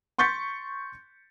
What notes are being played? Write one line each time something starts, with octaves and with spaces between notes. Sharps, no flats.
C6 C#6 G6 A6 B6 C#7